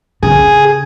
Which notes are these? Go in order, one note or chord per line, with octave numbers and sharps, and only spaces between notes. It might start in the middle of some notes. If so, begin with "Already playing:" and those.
C#3 G#4